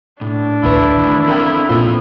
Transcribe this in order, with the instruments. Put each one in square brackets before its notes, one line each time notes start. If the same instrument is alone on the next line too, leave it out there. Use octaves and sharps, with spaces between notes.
[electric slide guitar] A2 [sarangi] D4
[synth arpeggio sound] A1 D2 B4 [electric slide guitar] A3 E5 [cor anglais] E4
[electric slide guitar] D#3 E3 A3
[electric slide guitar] C4 A4 F5 [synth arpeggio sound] A#4 G5
[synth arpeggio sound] A#2 F4 [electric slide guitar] C4 A4 C5